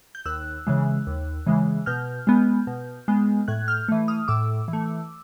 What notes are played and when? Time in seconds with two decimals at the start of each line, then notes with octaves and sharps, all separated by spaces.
0.15 G6
0.26 D#2 E6 F#6
0.67 C#3 E3 G#3
1.07 D#2
1.47 C#3 E3 G#3
1.86 B2 F6 G6
2.27 G#3 B3
2.67 B2
3.08 G#3 B3
3.48 A2 F#6 G#6
3.68 F6 G6
3.89 E3 A3
4.08 D#6 F6
4.28 A2 D6 E6
4.68 E3
4.73 A3